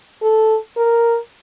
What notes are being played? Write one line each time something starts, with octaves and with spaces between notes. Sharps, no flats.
A4
A#4